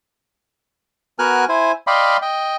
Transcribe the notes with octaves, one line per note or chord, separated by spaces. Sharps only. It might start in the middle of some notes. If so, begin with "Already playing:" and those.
B3 F#4 A#4 G#5 F6 F#6
E4 C5 G#5
D5 D#5 F5 G5 B5 C6
D#5 G5